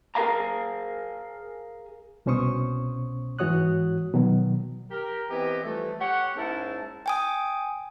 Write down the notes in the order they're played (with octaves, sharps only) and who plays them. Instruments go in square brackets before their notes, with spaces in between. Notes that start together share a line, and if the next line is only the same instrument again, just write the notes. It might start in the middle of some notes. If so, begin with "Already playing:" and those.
[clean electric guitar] G#4 A#4 B4 E5 F5 A#5
[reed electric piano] C2 B2 C#4 C5 C#6 D#6
G#2 E3 F#4 C#5 D#6 F#6
B2 D#3 F#3
[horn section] G4 A#4
E3 B3 C4 G4 D#5
E3 F3 G3 A3
G4 C#5 F#5
G#2 A#3 C#4 E4 A5
[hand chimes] G5 G#5 D#6